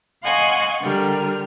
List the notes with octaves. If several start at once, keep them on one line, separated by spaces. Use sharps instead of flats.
D#5 F5 F#5 G#5 C6 C#6
D3 G3 A#4 F6